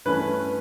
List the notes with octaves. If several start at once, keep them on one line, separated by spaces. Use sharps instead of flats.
G2 E3 A3 C#4 B4